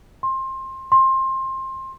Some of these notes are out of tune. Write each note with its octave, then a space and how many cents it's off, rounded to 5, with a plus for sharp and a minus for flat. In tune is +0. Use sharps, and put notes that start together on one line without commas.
C6 +20
C6 +20